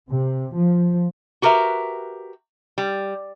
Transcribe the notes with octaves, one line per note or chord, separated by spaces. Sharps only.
C3
F3
F#4 G4 A#4 B4 E5
G3